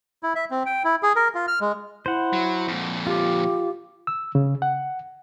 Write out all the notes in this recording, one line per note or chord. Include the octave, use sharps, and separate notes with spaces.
E4
E5
C4
G5
E4
G#4
A#4
F4
F6
G#3
E4 C5 F#5
F#3
F2 A#2
F4 G4
E6
C#3
F#5